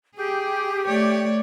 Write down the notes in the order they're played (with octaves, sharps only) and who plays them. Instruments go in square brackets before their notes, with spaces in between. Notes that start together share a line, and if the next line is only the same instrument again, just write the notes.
[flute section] G4 [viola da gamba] G#4
[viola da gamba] A3 C#5 D5